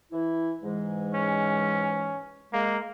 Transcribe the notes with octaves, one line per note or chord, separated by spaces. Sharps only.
E3 E4
G#2 E3 G#3
C#4
G#3 A#3